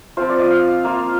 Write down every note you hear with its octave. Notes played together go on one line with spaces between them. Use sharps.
F3 C4 F4 C5
D5
D#5
F5
A#3 F4